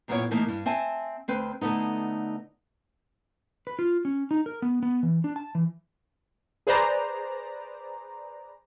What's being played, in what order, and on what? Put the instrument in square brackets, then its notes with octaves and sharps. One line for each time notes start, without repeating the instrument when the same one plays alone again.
[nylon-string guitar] F#2 A#2 A3 B3 E4 C#5
B2 E3 A3 A#3 D#4
G2
C4 E5 G#5 A5
D2 C4 B4
D3 A3 B3 D#4
[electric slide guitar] B4
F4
C#4
D#4
A#4
B3
B3
E3
D4
A5
E3
[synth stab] G#4 B4 C5 D5 A#5